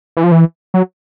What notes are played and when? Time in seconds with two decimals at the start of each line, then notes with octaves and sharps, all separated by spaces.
0.17 E3
0.24 F3
0.32 E3
0.74 F#3